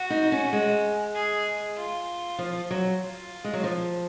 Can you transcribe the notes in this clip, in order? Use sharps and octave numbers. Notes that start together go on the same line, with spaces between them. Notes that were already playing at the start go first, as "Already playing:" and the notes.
Already playing: F#4
D#4
C#4
G#3
G#4
F4
F3
F#3
F4
G#3
F#3
F3